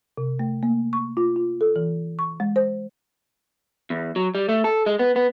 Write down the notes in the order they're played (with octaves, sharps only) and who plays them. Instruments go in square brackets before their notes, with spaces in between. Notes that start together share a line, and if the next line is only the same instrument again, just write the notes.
[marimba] C3
A3
A#3
C#6
F4
F4
A4
E3
C#6
G#3
C5
[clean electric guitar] E2
F#3
G3
A3
A4
G#3
B3
B3